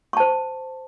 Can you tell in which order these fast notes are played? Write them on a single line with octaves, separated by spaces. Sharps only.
C#6 A5 C5